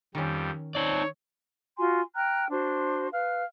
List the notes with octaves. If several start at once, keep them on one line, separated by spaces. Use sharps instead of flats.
F2 D#3 G3 C#4
C4 D#4 C#5 D5
F4 F#4 G#5 C6
G5 A#5 F6 F#6
D4 F#4 C5 C6
B4 F5 F6